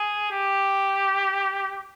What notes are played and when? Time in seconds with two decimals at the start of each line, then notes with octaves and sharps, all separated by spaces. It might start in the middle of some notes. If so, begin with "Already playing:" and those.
Already playing: G#4
0.32 G4